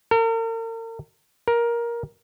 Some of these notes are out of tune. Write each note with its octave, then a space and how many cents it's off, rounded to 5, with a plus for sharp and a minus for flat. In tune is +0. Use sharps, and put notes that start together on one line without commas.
A#4 -40
A#4 +15